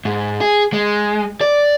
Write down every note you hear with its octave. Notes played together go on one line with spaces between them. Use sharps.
G#2
G#4
G#3
D5